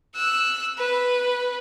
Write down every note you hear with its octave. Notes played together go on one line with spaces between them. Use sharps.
E6 F#6
B4